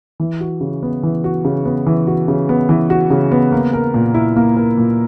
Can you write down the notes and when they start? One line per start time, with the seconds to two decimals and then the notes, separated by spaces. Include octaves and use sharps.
0.20 E3
0.41 F#4
0.61 C#3
0.83 B3
1.03 E3
1.24 F#4
1.45 C#3
1.65 B3
1.87 E3
2.07 F#4
2.28 C#3
2.49 B3
2.69 E3
2.90 F#4
3.10 C#3
3.32 B3
3.52 A#3
3.73 A#4
3.94 A#2
4.14 E4
4.36 A#3
4.57 A#4
4.78 A#2